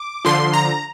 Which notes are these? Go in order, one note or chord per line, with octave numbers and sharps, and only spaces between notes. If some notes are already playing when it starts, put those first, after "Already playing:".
Already playing: D6
D3 F3 C6
A#5